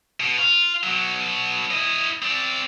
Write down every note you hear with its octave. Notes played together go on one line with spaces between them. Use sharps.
B2
F4
B2 F#3
E4 D#5
C4 D5